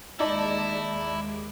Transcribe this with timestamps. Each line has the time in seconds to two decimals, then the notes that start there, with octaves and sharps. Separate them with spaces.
0.20 D#2 G#3 D#4 E4 D5 A5 D6